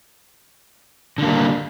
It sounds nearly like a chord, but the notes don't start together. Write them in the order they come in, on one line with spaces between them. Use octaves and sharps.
D3 A#3 G3